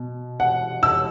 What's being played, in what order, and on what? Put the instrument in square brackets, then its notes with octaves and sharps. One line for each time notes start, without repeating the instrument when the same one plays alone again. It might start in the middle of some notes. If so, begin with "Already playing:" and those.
Already playing: [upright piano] B2
F#5
E6